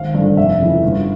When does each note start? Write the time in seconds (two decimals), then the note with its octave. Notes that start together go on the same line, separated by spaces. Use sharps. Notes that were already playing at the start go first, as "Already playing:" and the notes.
Already playing: G#1 F5
0.14 G2 D3
0.37 F1 E5
0.60 F2 C#3 E3
0.83 G1